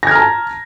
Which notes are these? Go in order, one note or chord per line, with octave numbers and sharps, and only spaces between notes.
A5 A#5 F6 G#6 A#6